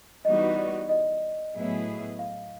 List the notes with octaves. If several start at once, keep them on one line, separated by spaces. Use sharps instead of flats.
E3 G3 B3 D#4 F#4 D#5
D5
D#5
A2 F#3 B3 E4 G#4
F5